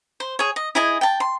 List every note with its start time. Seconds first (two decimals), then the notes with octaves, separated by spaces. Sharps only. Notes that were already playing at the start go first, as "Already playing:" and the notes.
0.20 C5
0.39 G#4 C#5
0.56 D#5
0.75 E4 G#4 D#5 G#5
1.01 G5 A5
1.20 C6